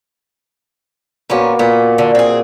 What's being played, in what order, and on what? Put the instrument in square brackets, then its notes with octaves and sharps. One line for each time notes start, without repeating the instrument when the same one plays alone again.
[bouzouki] A#2 B3 C#4 [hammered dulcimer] A#3 F#4 B4
[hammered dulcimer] A#2 [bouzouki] B3
[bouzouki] D3
C4 G#4